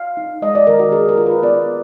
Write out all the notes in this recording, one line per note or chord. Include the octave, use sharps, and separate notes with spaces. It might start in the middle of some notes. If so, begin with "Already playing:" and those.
Already playing: F5
D#4
G#3 D#5
D5
D#3 A#4
F#4
D4 G#4
A#4
F4
B4
B3 D5